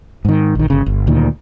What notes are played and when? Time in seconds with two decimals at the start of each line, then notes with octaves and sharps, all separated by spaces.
0.25 G#2 D#3
0.55 A#1 D#3
0.70 G1 C#3
0.86 G1
1.07 D2 A#2 D#3